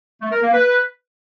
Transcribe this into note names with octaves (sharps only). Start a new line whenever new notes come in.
A3
A#4
A#3
B4